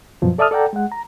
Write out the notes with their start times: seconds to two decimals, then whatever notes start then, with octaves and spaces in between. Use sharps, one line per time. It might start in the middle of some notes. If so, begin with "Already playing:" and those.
0.22 F#2 B2 F3 F#3
0.38 A4 D5 E5 A5 D#6 F6
0.51 A4 D5 F#5 G5 A#5
0.73 G#3 F#5
0.92 A#5